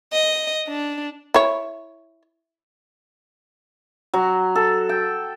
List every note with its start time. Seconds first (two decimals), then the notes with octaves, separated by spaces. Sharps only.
0.13 D#5
0.68 D4
1.34 E4 C#5
4.14 F#3
4.55 A4
4.89 G5